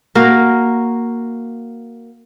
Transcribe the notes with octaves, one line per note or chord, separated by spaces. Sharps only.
A#3 F#4 A#4